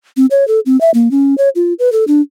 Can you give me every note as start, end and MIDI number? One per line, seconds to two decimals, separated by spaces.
0.17 0.26 60
0.31 0.47 73
0.48 0.60 69
0.66 0.79 60
0.81 0.91 76
0.94 1.11 58
1.11 1.35 61
1.38 1.49 73
1.56 1.73 65
1.79 1.92 71
1.92 2.04 69
2.08 2.21 62